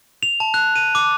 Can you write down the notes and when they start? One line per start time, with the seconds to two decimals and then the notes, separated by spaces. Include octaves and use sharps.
0.23 F7
0.40 A5
0.54 F#6
0.76 D#7
0.95 D6